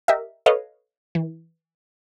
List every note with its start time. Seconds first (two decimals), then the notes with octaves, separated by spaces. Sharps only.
0.08 G4 A#4 D#5 E5
0.46 A4 B4 C#5 D#5 F5
1.15 E3